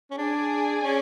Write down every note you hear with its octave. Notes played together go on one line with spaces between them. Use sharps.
C#4
D4 G#4 D5 G#5
C#4